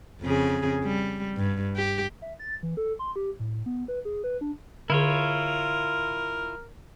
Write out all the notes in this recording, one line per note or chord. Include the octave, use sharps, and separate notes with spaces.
F2 C#3 G#4
G3
G2
G4
E5
A6
E3
A4
C6
G4
A2
B3
B4
G#4
B4
D4
D3 E4 F4 G#4 A#4 C#5